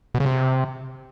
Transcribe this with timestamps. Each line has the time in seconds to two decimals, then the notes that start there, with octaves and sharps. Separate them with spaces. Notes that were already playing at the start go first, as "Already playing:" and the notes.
0.14 B2
0.20 C#3
0.26 C3